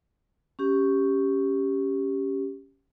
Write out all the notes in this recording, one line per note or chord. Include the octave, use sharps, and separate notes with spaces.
C#4 G4